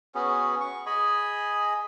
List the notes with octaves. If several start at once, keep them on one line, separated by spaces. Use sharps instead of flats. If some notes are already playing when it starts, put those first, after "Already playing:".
B3 C#4 F#4 G#4
C#6
G#4 D#5 G#5 B5